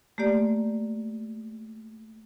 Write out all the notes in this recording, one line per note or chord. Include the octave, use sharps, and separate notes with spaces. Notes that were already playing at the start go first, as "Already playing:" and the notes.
A3 A#3 G4 D5